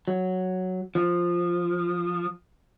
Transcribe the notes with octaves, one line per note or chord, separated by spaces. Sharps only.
F#3
F3